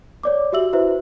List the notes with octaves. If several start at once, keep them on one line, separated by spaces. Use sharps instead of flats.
C#5 D5 D6
F#4 G4 E5 E6 F#7
E4 F#4 B4 C5 E5